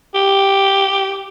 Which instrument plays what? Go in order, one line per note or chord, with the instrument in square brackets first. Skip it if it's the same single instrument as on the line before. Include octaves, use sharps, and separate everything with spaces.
[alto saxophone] G4